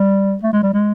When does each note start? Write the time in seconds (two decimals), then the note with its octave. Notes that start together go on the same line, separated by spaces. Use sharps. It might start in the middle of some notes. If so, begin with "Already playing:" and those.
Already playing: G3
0.43 A3
0.53 G#3
0.63 G3
0.74 G#3